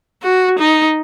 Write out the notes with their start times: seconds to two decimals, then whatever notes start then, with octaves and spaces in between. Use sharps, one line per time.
0.23 F#4
0.59 D#4